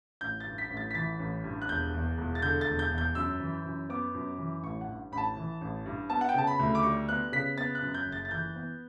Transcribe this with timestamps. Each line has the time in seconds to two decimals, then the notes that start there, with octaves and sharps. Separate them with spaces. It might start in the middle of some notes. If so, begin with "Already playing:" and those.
0.21 A1 G6
0.40 A6
0.46 G2
0.58 B6
0.70 A1
0.77 A6
0.91 B6
0.95 E3 A6
1.19 A1
1.44 G2
1.62 F#6
1.69 E1 G6
1.94 E2
2.18 E1
2.35 A6
2.42 D3 G6
2.61 A6
2.67 E1
2.79 G6
2.91 E2
2.98 G6
3.15 F#2 E6
3.40 E3
3.65 F#2
3.89 B3 D6
4.15 F#2
4.38 E3
4.63 A1 C#6
4.81 F#5
4.88 G2
5.12 A1 B5
5.18 A5
5.37 E3
5.61 A1
5.86 G2
6.10 B3 A5
6.21 F#5
6.29 G5
6.34 C#3 A5
6.47 B5
6.59 D2
6.75 D6
6.83 G3 C#6
7.09 B3 F#6
7.32 C#3 B6
7.57 B3 A6
7.75 F#6
7.82 F#2
7.94 G6
8.06 F#1
8.12 A6
8.25 A6
8.31 E3 G6
8.56 B3